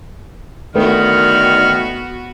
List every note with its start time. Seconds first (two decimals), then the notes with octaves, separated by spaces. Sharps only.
0.75 D3 D#3 A3 B3 F#4 B4 F6